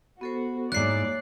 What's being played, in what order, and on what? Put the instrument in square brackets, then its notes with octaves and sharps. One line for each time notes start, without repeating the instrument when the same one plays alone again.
[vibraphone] B3 A4 C5 [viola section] F#4
[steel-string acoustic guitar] G#2 E4 [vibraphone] A#3 C#5 [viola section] D5 [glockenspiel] F#6 C7